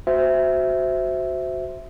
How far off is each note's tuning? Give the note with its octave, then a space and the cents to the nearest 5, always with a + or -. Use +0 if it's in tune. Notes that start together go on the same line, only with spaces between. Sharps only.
F#4 +0 C5 -10 E5 +0